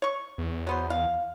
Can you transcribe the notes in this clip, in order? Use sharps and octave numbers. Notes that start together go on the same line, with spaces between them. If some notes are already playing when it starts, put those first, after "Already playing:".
C#5 C#6
E2
F#3 B3 C5
F5